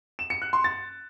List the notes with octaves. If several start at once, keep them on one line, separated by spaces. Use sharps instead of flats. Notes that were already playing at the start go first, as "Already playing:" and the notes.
E7
C#7
F#6
C6
A6